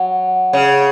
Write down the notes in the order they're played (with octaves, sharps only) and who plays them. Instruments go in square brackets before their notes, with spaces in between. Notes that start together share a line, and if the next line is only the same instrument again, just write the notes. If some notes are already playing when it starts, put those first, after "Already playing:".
Already playing: [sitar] F#3
C#3